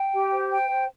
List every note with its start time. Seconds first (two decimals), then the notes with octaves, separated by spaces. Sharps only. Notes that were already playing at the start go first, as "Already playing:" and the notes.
Already playing: G5
0.11 G4
0.30 C5
0.50 G5
0.69 C5